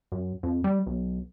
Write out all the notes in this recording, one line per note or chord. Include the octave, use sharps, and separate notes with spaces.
F#2
F2
G3
B1